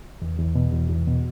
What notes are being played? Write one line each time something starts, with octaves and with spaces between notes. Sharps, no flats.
E2
E2
B2
E2
E2
B2